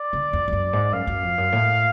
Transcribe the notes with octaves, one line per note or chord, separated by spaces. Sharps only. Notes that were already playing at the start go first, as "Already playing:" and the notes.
Already playing: D5
D3
F2
F2
F#2
G#2
F#2 F5
F#2
F2
F#2
A2